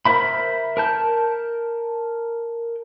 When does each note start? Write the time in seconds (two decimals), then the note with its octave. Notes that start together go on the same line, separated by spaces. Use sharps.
0.05 A#4 C5 E5 B5
0.77 A#4 A5 G6